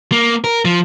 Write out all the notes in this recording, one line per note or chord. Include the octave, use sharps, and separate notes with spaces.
A#3
A#4
F3